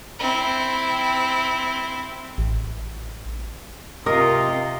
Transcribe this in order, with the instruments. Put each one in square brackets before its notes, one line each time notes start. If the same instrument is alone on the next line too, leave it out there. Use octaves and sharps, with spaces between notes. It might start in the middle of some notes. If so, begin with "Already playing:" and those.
[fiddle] C4 E4
[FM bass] A1
[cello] C3 F4 [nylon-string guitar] A#4 [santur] D#5